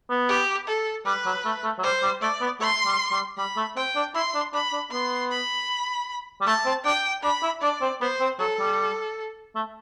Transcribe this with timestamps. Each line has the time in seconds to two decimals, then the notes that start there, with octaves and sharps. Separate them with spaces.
0.10 B3
0.29 G4
0.68 A4
1.06 G3 B4
1.26 F#3
1.45 A3
1.64 A3
1.78 F#3
1.83 G3 C5
2.03 G3
2.22 A3 D5
2.41 B3
2.60 A3 C6
2.86 G3
3.12 G3
3.37 G3 B5
3.56 A3
3.76 C4 G5
3.96 D4
4.15 E4 C6
4.34 D4
4.53 D4 B5
4.73 D4
4.92 B3 C6
5.31 B5
6.41 G3
6.46 A3 A5
6.66 C4
6.85 D4 G5
7.23 D4 B5
7.43 E4
7.62 D4 D5
7.81 C4
8.01 B3 C5
8.20 C4
8.39 F#3 A4
8.59 G3
9.55 A3